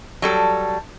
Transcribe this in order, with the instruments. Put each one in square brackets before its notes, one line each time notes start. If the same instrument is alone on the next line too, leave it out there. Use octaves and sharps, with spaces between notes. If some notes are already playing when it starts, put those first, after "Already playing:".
[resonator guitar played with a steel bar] F#3 G3 A4